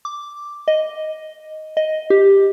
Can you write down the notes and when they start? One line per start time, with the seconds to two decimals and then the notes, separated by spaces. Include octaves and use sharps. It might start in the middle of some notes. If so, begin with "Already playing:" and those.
0.05 D6
0.68 D#5
1.77 D#5
2.10 G4